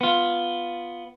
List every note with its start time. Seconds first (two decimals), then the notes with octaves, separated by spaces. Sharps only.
0.01 B3 F4